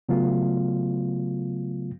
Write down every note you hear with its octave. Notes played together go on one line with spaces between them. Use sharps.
C#3 F#3 A3 B3 F4